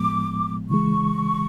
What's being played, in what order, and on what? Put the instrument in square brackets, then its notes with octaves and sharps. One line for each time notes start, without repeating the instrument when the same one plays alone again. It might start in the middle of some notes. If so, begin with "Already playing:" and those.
Already playing: [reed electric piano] A2 F3 G#3 B3 [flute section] D6
[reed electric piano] C#3 E3 G#3 [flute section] C#6